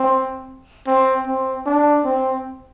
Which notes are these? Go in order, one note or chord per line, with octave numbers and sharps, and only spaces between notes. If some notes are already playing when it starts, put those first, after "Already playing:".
Already playing: C4
C4
C4
D4
C4